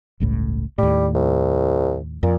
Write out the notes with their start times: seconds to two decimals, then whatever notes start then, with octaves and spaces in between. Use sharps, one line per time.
0.20 G1 C#2 A2
0.78 D#2 A2 G3
1.15 C2
2.23 F2 A#2